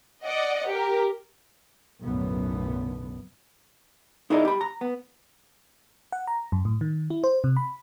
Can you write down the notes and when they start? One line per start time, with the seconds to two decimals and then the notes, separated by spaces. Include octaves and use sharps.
0.25 D5 D#5 F#5
0.68 G4 A#4
2.03 B1 F#2 A2 D3 B3
4.30 D#4 E4 G#4 A#4 D5 D#5
4.45 G4 B5
4.61 A#5
4.81 B3
6.12 F#5
6.27 A#5
6.52 F#2
6.65 A2
6.81 D#3
7.10 E4
7.24 C5
7.44 C3
7.57 B5